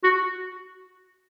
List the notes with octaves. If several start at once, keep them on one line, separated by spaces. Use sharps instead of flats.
F#4